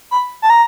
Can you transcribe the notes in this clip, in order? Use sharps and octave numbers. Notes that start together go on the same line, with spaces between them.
B5
A5
A#5